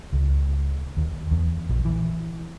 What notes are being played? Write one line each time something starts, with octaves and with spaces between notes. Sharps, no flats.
C#2
D#2
E2
A#1
E3